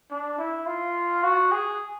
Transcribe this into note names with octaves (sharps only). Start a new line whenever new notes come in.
D4
E4
F4
F#4
G#4